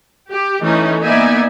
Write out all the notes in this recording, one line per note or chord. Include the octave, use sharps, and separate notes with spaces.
G4
E3 A3 C#4 D#4
A#3 B3 D#4 D5 E5 G#5